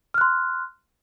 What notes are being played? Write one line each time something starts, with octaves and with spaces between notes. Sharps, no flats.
C6 F6 F#6